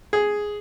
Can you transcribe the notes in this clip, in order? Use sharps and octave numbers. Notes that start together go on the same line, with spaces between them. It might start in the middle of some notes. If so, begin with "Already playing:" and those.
G#4